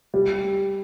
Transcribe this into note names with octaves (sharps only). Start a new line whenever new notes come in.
G3